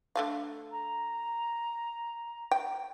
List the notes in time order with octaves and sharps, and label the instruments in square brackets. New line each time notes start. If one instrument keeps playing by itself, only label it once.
[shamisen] D3 A3 F5
[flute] A#5
[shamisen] G5